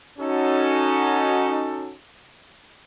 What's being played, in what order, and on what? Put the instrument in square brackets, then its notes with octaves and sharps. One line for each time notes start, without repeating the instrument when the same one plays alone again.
[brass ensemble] C#4 D#4 F#4 A4